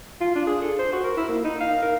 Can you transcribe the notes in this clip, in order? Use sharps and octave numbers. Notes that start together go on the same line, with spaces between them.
F4
D4
G#4
A4
C5
F#4
A#4
E4
A#3
D#4
F5
A#4